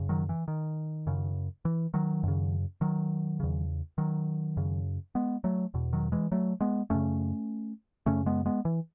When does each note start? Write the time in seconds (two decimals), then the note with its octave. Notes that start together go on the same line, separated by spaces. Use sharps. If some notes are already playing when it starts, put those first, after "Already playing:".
Already playing: F#2 C#3
0.09 D#3 F#3
0.29 E3
0.48 D#3
1.07 F#2 C#3
1.65 E3
1.94 D#3 F#3
2.23 F#2 C#3
2.81 D#3 F#3
3.40 E2 C#3
3.98 D#3 F#3
4.57 F#2 C#3
5.15 G#3 B3
5.44 F#3 A3
5.74 E2 B2
5.93 D#3 F#3
6.12 E3 G#3
6.32 F#3 A3
6.61 G#3 B3
6.90 F#2 C#3 A3 C#4
8.06 F#2 C#3 A3 C#4
8.26 G#3 B3
8.46 G#3 B3
8.65 E3